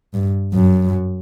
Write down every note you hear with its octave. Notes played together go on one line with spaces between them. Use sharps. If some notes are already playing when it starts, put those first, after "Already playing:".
G2
F#2